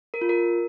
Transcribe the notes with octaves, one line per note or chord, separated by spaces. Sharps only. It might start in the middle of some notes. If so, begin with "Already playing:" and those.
A#4
F4
A#4